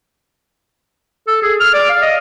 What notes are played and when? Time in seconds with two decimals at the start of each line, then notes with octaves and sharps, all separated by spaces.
1.27 A4
1.43 G#4
1.60 F6
1.74 D5
1.89 F5
2.02 D#5